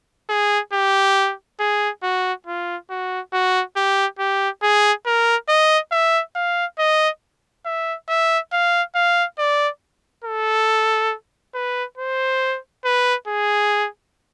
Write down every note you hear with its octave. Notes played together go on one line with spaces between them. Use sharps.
G#4
G4
G#4
F#4
F4
F#4
F#4
G4
G4
G#4
A#4
D#5
E5
F5
D#5
E5
E5
F5
F5
D5
A4
B4
C5
B4
G#4